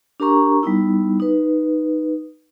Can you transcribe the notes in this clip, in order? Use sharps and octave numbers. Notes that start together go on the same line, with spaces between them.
D4 G4 A#4 A#5 C#6
G3 B3 D#4 E4
D#4 B4